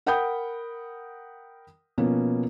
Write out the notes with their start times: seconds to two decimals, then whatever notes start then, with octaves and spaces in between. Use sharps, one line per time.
0.06 A#4 F#5 G5 B5 D#6 G6
1.98 B2 F3 A#3 B3 C#4